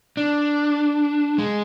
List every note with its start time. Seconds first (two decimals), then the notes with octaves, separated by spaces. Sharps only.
0.17 D4
1.38 G#3